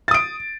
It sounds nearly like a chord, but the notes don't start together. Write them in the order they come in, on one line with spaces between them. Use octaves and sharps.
A6 D#6 D7